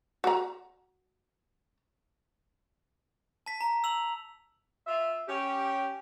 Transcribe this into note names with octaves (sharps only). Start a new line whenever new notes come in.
F#4 A#5
A5 B6
A#5
E6 F7 F#7
F4 E5
C#4 G4